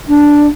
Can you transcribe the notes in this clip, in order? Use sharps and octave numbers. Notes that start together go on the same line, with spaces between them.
D4